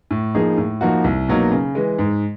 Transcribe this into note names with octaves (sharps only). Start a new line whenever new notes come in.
A2
F3 A#3 D#4 G#4
A2
F3 A#3 D#4 F#4
C2
B2 F#3 A#3 D#4
C#3
E3 G#3
G#2